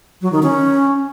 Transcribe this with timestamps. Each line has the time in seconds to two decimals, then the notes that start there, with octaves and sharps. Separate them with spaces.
0.22 F#3
0.32 D#3
0.43 C#4